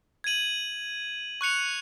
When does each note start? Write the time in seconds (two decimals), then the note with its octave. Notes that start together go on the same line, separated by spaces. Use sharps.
0.24 G#6 D#7 F#7
1.41 C#6 F#6 C#7 F7